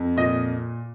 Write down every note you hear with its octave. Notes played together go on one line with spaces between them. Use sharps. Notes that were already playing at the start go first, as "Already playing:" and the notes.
Already playing: F2
A#2 D#5